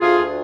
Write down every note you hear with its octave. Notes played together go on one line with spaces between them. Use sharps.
D2 F4 G#4
D2